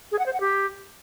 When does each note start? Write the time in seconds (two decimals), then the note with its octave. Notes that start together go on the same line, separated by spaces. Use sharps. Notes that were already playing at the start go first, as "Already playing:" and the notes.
0.12 G#4
0.19 F#5
0.26 C5
0.33 F#5
0.40 G4